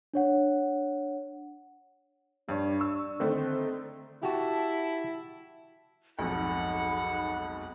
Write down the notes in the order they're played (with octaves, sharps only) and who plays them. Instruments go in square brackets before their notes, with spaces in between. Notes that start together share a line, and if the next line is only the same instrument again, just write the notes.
[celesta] D4 C#5 F#5
[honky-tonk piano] G2 C#5 [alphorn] D4
[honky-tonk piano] C#6 E6
[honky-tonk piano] D3 D#3 A3 [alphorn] C4
[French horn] E4 [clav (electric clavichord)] F#4 G4 [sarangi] A5
[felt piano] B1 F2 G#2 [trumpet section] A4 F#5 [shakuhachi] B5